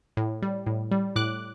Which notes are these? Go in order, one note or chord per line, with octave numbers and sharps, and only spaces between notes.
A2
G3
A2
G3
A2 D6 F#6